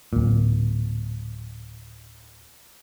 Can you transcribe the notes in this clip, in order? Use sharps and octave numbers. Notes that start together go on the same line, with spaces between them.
D1 A#2